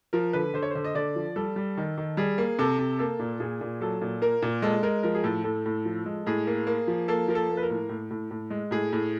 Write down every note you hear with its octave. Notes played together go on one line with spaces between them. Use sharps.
F3 A#4
D3 B4
D3 C5
C#5
D3 C5
D#5
D3 D5
F3
G3 A4
G3
D#3
D#3
G3 G#4
A#3
C3 A4
C3
A#3 A4
A#2
A#2 G#4
A#2
F#3 A4
A#2
A#3 A#4
A#2
G#3 A4
G#3 A#4
F3 A#4
G#4
A2 A4
A2 A4
A2
F3
G#3
A2 G#4
A#3
A#3
F3
A#3 A4
F3 A#4
A4
A#3
B4
A#4
A2
A2
A2
A2
G#3
A2 G#4
A2